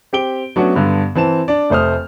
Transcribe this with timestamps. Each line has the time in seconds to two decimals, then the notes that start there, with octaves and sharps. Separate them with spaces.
0.13 C4 G4 D7 G7
0.56 F#3 A3 B3 C#4 D4 F#4
0.75 G2 D3 B3
1.15 E3 C4 A5 E7
1.48 D4 D5
1.70 F1 A3 C5 D#6 F6